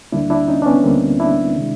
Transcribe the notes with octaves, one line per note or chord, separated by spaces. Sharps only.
D2 D3 G3 A#3 D4 E4
D4 E4
C#4 D#4
D4
B3 C#4
D2 D3 G3 A#3 C4
D4 E4
C3 D#3 G#3